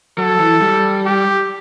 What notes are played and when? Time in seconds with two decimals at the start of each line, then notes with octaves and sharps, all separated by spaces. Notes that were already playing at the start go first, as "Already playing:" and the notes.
0.18 F#3 A4
0.40 E3
0.62 G3
1.06 G4